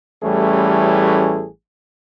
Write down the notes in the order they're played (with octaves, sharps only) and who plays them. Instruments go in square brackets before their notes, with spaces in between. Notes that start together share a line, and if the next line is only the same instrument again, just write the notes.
[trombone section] A1 E3 G3 A3 C#4 G#4